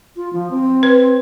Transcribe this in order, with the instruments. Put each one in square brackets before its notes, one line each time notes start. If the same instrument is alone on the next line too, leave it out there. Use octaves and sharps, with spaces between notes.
[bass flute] F4
F3
C4
[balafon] B4